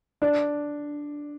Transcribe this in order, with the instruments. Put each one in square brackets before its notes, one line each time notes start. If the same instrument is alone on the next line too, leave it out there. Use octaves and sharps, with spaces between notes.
[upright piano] D4